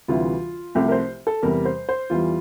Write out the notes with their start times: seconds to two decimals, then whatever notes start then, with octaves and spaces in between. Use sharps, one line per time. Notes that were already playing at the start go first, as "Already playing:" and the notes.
0.08 D2 C3 E3 G3 F4
0.75 C2 C3 F3 A3 G4
0.88 A#4
0.92 C5
1.27 A4
1.43 E2 C3 G3 A#4
1.65 C5
1.89 C5
2.10 E2 E3 G3 F4